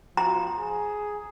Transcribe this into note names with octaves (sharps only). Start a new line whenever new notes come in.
F3 A#5
G#4